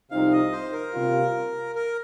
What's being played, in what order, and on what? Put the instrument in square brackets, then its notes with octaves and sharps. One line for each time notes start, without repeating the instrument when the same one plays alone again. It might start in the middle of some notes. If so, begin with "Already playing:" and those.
[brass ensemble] C2 C3 F3 C4 D#4 [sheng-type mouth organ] F5
[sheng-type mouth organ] D#5
C5
A#4
[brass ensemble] C3 G3 A#3 F4
[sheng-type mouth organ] A#4